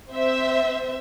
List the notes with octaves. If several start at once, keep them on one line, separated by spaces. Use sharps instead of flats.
C4 C5 E5